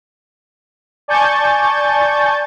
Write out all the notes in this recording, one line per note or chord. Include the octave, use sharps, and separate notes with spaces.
D5 G#5 A5 C#6 G6 A6